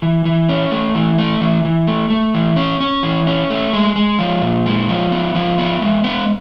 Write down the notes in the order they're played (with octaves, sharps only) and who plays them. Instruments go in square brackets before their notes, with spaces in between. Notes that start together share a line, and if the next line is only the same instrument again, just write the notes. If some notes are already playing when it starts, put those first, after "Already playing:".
[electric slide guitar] E3
E3
C#4
A3
E3
A3
E3
E3
A3
A3
E3
C#4
C#4
E3
C#4
A3
G#3
G#3
F3
A#2
G#3
F3
B3
F3
B3
G#3
B3